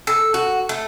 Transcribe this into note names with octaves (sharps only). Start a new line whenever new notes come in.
A4
F#4
A3